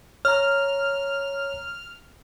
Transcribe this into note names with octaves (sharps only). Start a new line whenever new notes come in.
C#5 A#5 F6